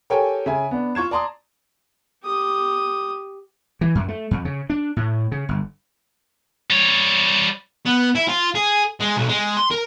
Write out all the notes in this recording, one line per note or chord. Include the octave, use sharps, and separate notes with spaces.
G4 A4 A#4 C#5 G5 G#5
C#3 E5 G#5
B3 D4
F4 C#6 G#6 E7
D5 A5 A#5 C6 D#6
G4 D#6
E3
F#2
A3
F2
C#3
D4
A2
C#3
G1
G3 C#5
B3
E4
F4
G#4
G#3
B1
G#3
C6
A#4